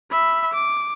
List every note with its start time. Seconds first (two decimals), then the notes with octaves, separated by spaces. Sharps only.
0.11 E5 B5
0.53 D6